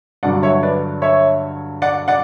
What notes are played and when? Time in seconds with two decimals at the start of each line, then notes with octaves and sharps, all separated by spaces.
0.23 G2 D3 F#3 D5 F#5
0.43 C#5 E5
0.63 B4 D5
1.02 C#5 E5
1.82 D5 F#5
2.08 D5 F#5